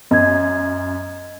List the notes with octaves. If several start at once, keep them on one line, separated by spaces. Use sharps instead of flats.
F#2 D#5 G#6